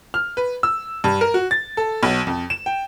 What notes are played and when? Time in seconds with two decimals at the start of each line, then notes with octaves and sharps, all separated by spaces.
0.14 F6
0.37 B4
0.63 E6
1.04 G2
1.21 A#4
1.34 F#4
1.51 A6
1.77 A4
2.03 B1
2.27 F2
2.50 E7
2.66 G5